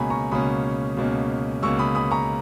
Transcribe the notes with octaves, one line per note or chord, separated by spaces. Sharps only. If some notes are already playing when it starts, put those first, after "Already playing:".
Already playing: C#2 B2 A#3 C#4 G#5 A#5 B5
A#5 C#6
C#2 B2 A#3 C#4 B5 D#6
C#2 B2 A#3 C#4
C#2 B2 A#3 C#4 C#6 E6
B5 D#6
B5 D#6
A#5 C#6